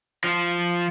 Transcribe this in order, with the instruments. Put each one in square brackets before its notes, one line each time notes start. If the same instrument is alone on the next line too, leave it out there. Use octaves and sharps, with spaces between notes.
[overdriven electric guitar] F3